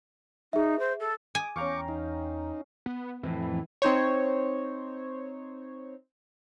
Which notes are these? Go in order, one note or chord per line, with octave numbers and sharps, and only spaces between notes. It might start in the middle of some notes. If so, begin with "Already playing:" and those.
D#4 G#4 E5
C5
A4
G#5 D6 D#6
E2 C#4 F5 G5 A#5 C#6 D6
D#4
B3
F2 A2 E3
C4 D#4 C5 C#5